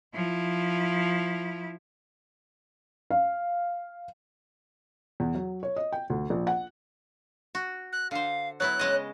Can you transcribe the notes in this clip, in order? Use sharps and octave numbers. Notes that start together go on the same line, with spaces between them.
F3 E4
F5
E2
F#3
C#5
D#5
G5
D2
A#1
F#5
F#4
F#6
D3 C5 F5
F#3 B3 E4 C#5 F#6
C#3 G#3 D#5